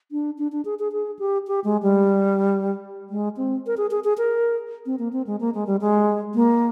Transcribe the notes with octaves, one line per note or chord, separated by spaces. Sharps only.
D4
D4
D4
G#4
G#4
G#4
G4
G4
G#3
G3
G#3
C4
A#4
G#4
G#4
G#4
A#4
C4
A#3
C4
G#3
A#3
G#3
G3
G#3
A#3